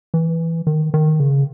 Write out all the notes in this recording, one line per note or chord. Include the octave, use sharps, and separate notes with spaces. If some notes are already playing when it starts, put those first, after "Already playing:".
E3
D#3
D#3
C#3